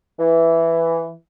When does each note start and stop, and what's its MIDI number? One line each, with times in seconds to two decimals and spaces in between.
0.19 1.10 52